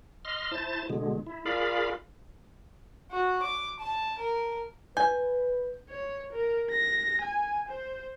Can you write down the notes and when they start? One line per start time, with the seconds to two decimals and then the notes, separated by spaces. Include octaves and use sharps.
0.25 D#5 C6 F6
0.51 E4 C5 A5 A6
0.90 B2 D3 G#3
1.26 E4
1.46 F4 G#4 A#4 D5 F5 B5
3.11 F#4
3.43 D6
3.80 A5
4.19 A#4
4.97 B4 G#5 G6
5.90 C#5
6.33 A#4
6.70 A#6
7.22 G#5
7.69 C5